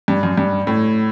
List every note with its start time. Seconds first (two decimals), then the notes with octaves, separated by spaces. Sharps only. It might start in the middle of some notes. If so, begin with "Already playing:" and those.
0.08 G2
0.23 F#2
0.37 G2
0.67 A2